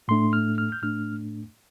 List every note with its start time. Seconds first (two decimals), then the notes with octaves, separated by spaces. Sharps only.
0.08 A2 A3 D4 C6
0.33 F6
0.58 F6
0.72 G6
0.82 A2 A3 D4 F6